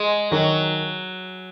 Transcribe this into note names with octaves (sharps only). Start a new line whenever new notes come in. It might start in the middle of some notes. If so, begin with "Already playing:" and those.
Already playing: G#3
D#3 F#3